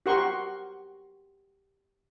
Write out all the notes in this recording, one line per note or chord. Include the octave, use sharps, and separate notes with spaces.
F#4 G4 A#4 F#5 C6 C#6